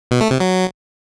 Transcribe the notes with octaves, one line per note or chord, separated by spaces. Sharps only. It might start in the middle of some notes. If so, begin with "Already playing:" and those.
B2
A3
C3
F#3